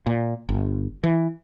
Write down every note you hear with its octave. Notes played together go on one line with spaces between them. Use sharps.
A#2
G1
E3